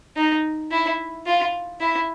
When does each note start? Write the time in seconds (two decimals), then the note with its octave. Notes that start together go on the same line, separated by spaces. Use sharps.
0.17 D#4
0.71 E4
1.26 F4
1.81 E4